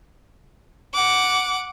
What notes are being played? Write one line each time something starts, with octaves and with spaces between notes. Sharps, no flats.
F#5 D6